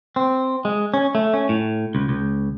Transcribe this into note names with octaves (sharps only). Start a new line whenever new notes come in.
C4
G#3
C#4
A3
C#4
A2
C#2
C#2